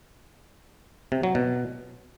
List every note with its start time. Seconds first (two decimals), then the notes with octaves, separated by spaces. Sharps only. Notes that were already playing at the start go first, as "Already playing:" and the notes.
1.12 C3
1.23 F#3
1.35 B2